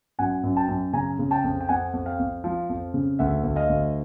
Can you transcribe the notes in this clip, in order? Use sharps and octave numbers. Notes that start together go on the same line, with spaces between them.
F#2 F#5 G#5
F#2
G5 A5
F#2
C#3 G#5 A#5
C#3
G5 A5
F2
G5
F2 F#5 G#5
F2
F5 G5
F2
F3
F2
C#3
D2 E5 F#5
D2
D#5 F5
D2